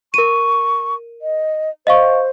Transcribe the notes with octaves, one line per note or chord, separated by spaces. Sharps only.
A#4 C#6 D#7
D#5
C5 D#5 F5 C#6